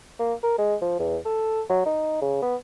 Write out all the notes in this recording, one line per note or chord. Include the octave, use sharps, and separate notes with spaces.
A#3
A#4
G#3
F3
E2
A4
F#3
D#4
C#3
B3